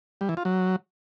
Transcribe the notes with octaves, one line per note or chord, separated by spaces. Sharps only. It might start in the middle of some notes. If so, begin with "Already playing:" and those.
G3
E3
F4
F#3